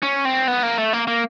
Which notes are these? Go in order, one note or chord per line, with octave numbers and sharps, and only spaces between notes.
C#4
C4
B3
A#3
A3
A#3
A#3